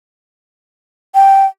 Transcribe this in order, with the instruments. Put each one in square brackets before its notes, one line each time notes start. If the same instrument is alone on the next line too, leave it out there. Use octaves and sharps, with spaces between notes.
[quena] G5